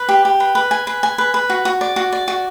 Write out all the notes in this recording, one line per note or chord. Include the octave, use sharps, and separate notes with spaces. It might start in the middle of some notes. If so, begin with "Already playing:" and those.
Already playing: B4
G4
G4
B4
B4
G#5
B4
G#5
B4
B4
F#4
F#4
D5
F#4
D5
F#4